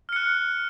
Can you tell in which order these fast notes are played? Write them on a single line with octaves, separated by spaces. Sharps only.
F6 C#7 F#6